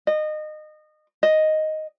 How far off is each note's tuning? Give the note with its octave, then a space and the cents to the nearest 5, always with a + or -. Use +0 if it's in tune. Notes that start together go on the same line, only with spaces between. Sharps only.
D#5 -25
D#5 +0